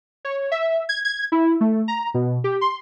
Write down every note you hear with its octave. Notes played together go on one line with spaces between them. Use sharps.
C#5
E5
G#6
G#6
E4
A3
A#5
B2
G4
C6